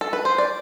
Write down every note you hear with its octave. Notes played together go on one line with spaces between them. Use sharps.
A4
B4
C5
D5